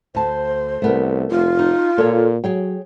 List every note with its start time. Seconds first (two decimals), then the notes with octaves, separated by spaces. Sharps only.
0.15 D2 C5 A5
0.82 C2 A3 B3 A#4
1.30 F1 F4
1.59 D#4
1.98 A#2 A4 C#5
2.44 F#3 G#4 C#5 G5